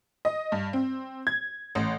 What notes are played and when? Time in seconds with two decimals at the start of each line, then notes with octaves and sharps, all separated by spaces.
0.25 D#5
0.52 G2
0.73 C4
1.27 G#6
1.75 A1